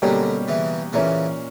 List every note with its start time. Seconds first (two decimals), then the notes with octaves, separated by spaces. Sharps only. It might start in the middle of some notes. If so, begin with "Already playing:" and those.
0.02 B2 D3 F#3 G3 A#3 C#4 G4
0.48 C#3 E3
0.93 A#2 C#3 E3 A#3 C#4